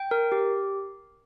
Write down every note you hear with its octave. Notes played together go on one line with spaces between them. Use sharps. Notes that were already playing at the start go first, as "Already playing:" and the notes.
Already playing: G5
A#4
G4